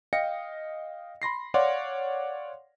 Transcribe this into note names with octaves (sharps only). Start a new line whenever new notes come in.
D#5 F5 G5 A#6 C#7
B5 C6 A#6 C7
C#5 D5 F5 F#5 C6 D6